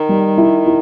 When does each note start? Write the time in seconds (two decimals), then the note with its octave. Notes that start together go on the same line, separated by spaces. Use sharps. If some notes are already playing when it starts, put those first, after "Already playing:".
Already playing: D#3
0.09 G3
0.38 E4
0.66 E4